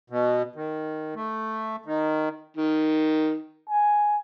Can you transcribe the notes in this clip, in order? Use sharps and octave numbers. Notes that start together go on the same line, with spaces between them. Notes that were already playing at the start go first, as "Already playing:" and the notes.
B2
D#3
A3
D#3
D#3
G#5